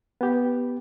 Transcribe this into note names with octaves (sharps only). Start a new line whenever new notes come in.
B3 G4